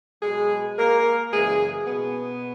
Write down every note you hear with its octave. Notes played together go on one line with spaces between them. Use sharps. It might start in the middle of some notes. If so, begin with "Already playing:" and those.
B2 F#3 G#3 G#4
A#3 A#4
F#2 C#3 E3 G#3 G#4
B2 B3